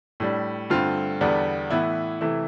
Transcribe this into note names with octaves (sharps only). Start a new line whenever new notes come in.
A2 G3 D4
G2 D3 A3 C4 F4
E2 D3 G3 B3 D4
A2 E3 B3 E4
C3 E3 A3 E4